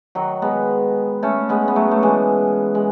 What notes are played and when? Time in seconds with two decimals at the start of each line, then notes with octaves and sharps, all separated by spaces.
0.15 D#3 F#3
0.42 G#3 B3
1.23 A3 C#4
1.49 G#3 B3
1.68 B3
1.76 F#3 A3
1.91 A3
2.03 E3 G#3
2.75 G#3